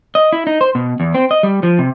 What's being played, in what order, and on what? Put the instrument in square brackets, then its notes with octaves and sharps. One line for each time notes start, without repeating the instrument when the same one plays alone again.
[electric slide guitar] D#5
E4
D#4
C5
B2
E2
C4
D#5
G3
F3
C3